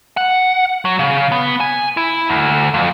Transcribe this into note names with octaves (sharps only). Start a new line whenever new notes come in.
F#5
F#3
C#3
B3
G#5
E4
D2
F2